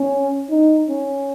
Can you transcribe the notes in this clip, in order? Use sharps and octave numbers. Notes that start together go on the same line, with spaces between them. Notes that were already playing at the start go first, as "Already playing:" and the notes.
Already playing: C#4
D#4
C#4